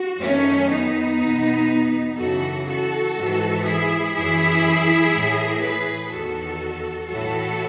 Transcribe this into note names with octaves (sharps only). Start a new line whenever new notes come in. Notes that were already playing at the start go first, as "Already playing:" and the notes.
Already playing: F#4
F#2 D#3 A3 C#4
B3 D#4
E2 B2
F#2 C#3 E3 F#4 A4
F#4 A4
G#2 E3
E4 G#4
F#2 E3 E4 G#4
A2 E3
G#4 B4
E2 D#3 F#4 A4
A2 E3 F#4 A4